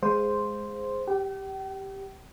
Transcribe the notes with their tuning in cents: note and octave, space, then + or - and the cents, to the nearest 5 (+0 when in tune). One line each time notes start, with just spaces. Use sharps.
G#3 +0 C5 +0 F5 +0
G4 +0 G5 -40